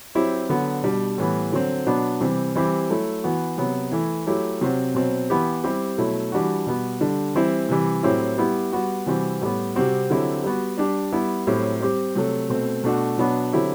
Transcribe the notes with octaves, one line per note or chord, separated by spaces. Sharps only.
F#3 C4 E4 G4
D3 F#3 B3
B2 G3 D4
A2 E3 G3 B3
D3 F#3 C4
B2 F#3 B3 D4
C3 E3 G3 C4
E3 G3 C4 E4 G4
F#3 A3 E4
E3 B3 F#4
C3 F#3 B3
E3 A3 E4
F#3 A3 E4 G4
C3 F#3 C4 F#4
B2 F#3 C4
E3 B3 E4 G4
G3 C4 E4 G4
B2 F#3 A3 E4
E3 G3 D4 F#4
B2 G3 B3
D3 G3 D4
E3 G3 C4 E4
C3 E3 G3
A2 F#3 C4 E4 G4
G3 B3 E4 G4
G3 B3 F#4
C3 E3 G3 C4 F#4
A2 G3 B3
C3 G3 C4 F#4
D3 F#3 C4 E4 G4
G3 B3 F#4
G3 D4 G4
G3 B3 E4
A2 F#3 C4 E4 G4
G3 C4 G4
C3 F#3 A3
B2 A3 C4
B2 A3 D4 F#4
B2 F#3 B3 D4 F#4
D3 F#3 C4 E4 G4